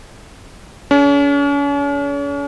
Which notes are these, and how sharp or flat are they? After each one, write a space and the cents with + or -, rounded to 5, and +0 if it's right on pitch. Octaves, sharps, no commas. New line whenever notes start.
C#4 +40 G#4 +40